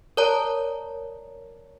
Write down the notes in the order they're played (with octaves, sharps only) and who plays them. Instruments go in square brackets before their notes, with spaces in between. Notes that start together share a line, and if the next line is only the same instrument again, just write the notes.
[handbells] A#4 C#5 D5 A5 A#5